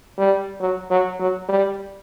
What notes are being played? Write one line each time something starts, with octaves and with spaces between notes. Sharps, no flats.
G3
F#3
F#3
F#3
G3